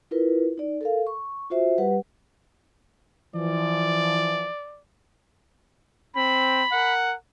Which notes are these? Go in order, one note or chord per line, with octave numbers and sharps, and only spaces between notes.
E4 F4 A#4 B4
D#4 D5
A4 A#4 F5
C#6
F4 F#4 C5 E5
G3 G4 B4 F#5
E3 F3 D5
C4 B5
A#4 F#5